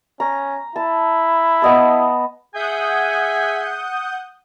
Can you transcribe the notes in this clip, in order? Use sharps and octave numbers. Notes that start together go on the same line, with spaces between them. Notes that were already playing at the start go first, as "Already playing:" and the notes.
C#4 A#5
E4 A5
B3 D#5 A5
G#4 E5 F#5 G#5 D#6 G6